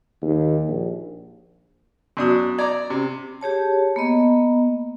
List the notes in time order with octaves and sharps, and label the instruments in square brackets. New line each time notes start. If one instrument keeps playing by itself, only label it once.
[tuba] D#2
A#1
[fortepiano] F#2 D4 D#6 [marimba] B3 F#4
[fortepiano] D5 A#5 D6 [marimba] G#6
[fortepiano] C3 [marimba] C#4
[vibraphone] G4 G#4 C#5 A5
A#3 B3 D#5